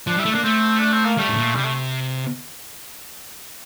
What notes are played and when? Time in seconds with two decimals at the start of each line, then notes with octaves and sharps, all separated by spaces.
0.07 F3 D4
0.16 G3 E4
0.25 A3
0.32 A#3 D4
0.44 A3 C4
0.79 D4
0.93 C4
1.05 A#3
1.18 G3 A3
1.28 A2
1.37 A#2
1.55 C3 G3
1.64 A3